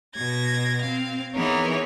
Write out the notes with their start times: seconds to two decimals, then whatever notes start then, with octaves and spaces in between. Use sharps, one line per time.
0.16 B2 G#6 A#6
0.81 C4 F5
1.34 E3 B3 D#4 G#4 A#4 C#5